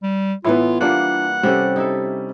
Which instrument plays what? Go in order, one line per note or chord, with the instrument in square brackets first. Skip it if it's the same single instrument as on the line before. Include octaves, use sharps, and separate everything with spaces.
[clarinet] G3
[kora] A2 E3 [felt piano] B3 E4 [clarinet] F4
[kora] E3 G3 A#3 [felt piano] D4 F4 [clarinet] F#5
[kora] C3 G4 A4 [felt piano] G3 C#4
[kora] D#4 E4 A4